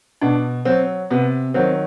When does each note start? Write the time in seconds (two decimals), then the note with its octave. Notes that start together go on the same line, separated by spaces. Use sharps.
0.21 B2 D4
0.65 F#3 C4
1.10 C3 B3
1.54 D#3 F#3 C4